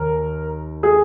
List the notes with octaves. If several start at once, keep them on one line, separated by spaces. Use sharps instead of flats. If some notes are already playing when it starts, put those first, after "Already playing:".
Already playing: D#2 A#4
G#4